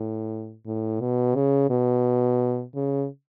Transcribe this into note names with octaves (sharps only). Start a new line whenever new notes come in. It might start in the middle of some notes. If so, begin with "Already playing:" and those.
Already playing: A2
A2
B2
C#3
B2
C#3